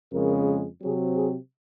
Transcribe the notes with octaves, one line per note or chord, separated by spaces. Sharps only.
F2 C#3 G#3 A#4
C3 F#3 C4 G#4
G#4